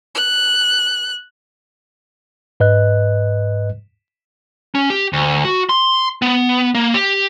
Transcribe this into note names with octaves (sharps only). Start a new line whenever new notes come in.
F#6
G#2 B4 D#5 F#6
C#4
G4
D2
F#4
C6
B3
A#3
G4